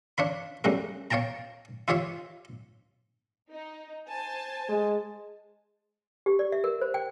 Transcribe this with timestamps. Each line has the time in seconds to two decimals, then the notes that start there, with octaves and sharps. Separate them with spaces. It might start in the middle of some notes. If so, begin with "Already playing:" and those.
0.18 D4 C#5 F5 B5
0.64 C#3 G3 A3 F#4 A#4
1.11 C#5 F5 G5 A5 A#5
1.88 E4 F4 G4 C#5 E5 F5
3.51 D#4
4.09 C5 G#5 A5
4.69 G#3
6.26 G4
6.39 D5
6.52 E5
6.64 A#4
6.81 C5
6.94 G5